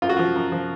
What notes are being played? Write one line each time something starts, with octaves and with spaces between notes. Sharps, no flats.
F#2 F4
F#4
F3 F4
F#2
F3